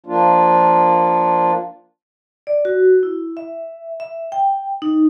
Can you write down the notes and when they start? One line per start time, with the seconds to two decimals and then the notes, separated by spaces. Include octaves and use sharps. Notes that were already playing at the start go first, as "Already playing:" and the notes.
0.06 F3 A#3 D4 F4
2.47 D5
2.65 F#4
3.03 E4
3.37 E5
4.00 E5
4.32 G5
4.82 D#4